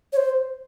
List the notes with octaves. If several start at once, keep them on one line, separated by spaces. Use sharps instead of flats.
C#5
C5